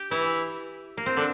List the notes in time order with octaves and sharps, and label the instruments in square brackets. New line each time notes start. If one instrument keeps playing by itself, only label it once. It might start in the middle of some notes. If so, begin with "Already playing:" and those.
Already playing: [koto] G4
[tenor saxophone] E3 [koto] E4
[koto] A#3
C4
[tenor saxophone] D3 [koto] D4